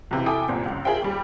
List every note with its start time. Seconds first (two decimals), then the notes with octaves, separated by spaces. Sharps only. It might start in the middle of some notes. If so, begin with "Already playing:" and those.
0.11 B1 C3 E3
0.26 E4 A4 G5 G#5 D6 D#6
0.49 G1 C2 A#2 C4
0.66 C#2 F#2
0.85 F4 G#4 A#4 C5 E5 G5
1.02 D#2 G3